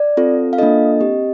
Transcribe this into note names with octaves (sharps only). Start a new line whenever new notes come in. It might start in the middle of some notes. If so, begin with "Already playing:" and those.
Already playing: D5
C4 F4 A4
F5
A#3 D4 F4 A4 D#5
C4 G4